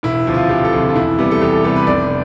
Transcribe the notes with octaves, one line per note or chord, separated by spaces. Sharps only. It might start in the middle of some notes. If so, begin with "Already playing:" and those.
E1 E4
D2 C3 F3
F4
E1 G4
A4
D2 C3 F3
F4
E2 E4
C3 G3 B3
A4
E2 G4
A4
C3 G3 B3 A4
B4
F1 D5